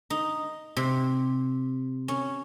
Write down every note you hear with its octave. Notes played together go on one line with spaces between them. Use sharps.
D#4
C3
C#4